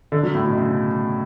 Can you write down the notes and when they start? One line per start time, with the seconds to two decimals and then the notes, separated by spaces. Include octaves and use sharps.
0.12 D3
0.23 F#3
0.35 A2
0.46 B2
0.58 C#3